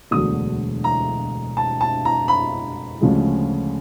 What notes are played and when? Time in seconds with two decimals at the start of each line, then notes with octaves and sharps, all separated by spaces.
0.11 E1 D2 D3 F#3 D#6
0.84 A#5
1.57 A5
1.81 A5
2.05 A#5
2.28 B5
3.01 D2 C#3 F3 G#3